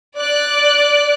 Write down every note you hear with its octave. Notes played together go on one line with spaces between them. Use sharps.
D5 F#6